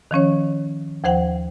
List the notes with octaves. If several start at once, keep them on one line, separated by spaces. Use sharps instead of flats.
D#3 F3 C#4 C#5
D#2 F3 C5 F#5 G5